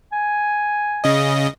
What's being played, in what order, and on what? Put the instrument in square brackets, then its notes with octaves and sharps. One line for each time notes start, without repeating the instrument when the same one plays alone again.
[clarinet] G#5
[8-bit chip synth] C#3 D#5